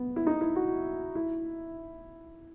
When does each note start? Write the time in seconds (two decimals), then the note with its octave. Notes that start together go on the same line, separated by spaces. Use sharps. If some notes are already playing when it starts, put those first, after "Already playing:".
Already playing: B3
0.16 E4
0.27 D#4
0.41 E4
0.56 F#4
1.15 E4